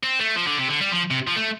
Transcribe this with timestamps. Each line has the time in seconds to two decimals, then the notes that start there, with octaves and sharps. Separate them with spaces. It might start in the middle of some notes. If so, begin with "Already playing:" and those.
0.03 C4
0.20 A3
0.36 F3
0.47 D3
0.59 C3
0.69 D3
0.81 G3
0.92 F3
1.11 C3
1.27 F3
1.36 A3